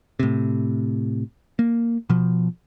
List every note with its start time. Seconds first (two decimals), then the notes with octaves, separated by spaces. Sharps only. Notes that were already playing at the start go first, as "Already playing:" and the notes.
0.19 A2 C3
1.59 A#3
2.09 B2 F3